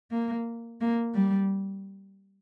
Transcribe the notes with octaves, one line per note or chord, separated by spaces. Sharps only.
A#3
A#3
G3